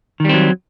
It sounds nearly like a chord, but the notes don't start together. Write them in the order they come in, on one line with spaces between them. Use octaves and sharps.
D#3 G3 C4 F#3